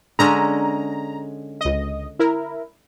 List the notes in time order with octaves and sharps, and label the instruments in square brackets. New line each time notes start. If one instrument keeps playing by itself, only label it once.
[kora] D3 G#3 C#4 [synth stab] A#5
[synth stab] C#2 D#5
E4 A#4